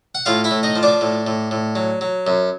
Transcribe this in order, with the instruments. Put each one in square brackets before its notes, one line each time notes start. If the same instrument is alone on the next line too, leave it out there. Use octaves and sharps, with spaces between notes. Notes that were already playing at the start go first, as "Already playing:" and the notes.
[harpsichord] F#5
A2 F4 F5
E4 E5
A2
D#4 D#5
F3
D4 D5
A2
A2
A2
F#3
F#3
F#2